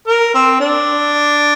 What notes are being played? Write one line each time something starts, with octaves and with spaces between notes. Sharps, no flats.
A#4
C4
D4